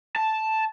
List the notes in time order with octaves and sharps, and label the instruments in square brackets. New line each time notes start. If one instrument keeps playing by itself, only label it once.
[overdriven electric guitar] A5